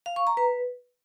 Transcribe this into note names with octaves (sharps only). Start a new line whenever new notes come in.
F5
C#6
A#5
B4